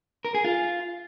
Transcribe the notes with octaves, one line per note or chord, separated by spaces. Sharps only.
A#4
G#4
F4